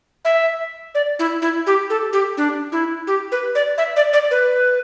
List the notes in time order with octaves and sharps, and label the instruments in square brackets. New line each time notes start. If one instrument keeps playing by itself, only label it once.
[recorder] E5
D5
E4
E4
G4
A4
G4
D4
E4
G4
B4
D5
E5
D5
D5
B4